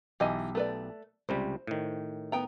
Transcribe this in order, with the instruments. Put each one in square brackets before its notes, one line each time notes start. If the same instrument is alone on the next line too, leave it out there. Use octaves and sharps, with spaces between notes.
[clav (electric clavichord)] B1 G4 [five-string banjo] E3 D#5 G#5
[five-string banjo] A3 B4 D5
[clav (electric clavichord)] C#2 C3 G3 [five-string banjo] C5
[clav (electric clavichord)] A2 D#3
[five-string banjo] B3 G5 A#5